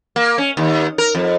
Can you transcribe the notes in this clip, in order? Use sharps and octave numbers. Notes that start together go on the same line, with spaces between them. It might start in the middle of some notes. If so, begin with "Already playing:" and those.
A#3
C#4
D#2
A#4
F2